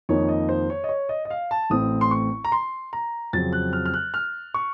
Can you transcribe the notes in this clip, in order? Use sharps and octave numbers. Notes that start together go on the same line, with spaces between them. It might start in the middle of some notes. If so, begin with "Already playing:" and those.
F2 D#3 A#3 D#4 C#5
D#5
C5
C#5
D#5
C#5
D#5
D#5
F5
A5
A1 A2 A3 C4 D#6
C6
C#6
A#5
C6
A#5
F2 C#3 F#3 C4 A6
F#6
F6
F6
F#6
F6
C#6